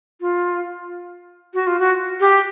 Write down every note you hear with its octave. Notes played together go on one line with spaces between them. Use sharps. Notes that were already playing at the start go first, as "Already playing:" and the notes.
F4
F#4
F4
F#4
G4